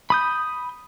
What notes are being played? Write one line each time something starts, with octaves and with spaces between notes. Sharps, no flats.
B5 D#6 G6